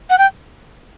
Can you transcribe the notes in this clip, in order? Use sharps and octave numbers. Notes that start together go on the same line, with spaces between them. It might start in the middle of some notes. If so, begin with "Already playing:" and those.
F#5
G5